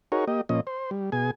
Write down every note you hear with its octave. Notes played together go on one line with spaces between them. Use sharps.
D#4 F#4 G#4 A#4 C#5
A#3 G4 D#5
A#2 F3 C#4 D#5
C5
G3
B2 G#4 G#5